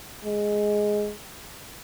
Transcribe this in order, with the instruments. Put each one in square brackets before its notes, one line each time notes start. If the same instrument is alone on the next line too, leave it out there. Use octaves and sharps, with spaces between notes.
[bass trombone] G#3